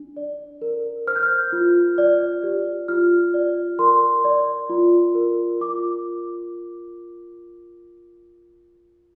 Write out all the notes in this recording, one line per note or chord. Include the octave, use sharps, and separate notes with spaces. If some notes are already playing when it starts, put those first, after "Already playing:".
Already playing: D4
D5
A#4
C5 F6
G6
F6
F4
D5
G4
F4 F6
D5
A#4 C6
D5
F4
A#4
F4 D6